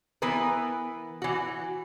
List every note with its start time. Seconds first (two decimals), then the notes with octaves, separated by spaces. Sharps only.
0.22 E3 B3 A#4 B4
1.22 E3 F#4